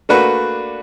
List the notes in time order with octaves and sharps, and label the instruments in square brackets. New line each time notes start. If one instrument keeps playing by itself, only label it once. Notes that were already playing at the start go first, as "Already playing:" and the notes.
[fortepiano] A3 A#3 D4 F#4 B4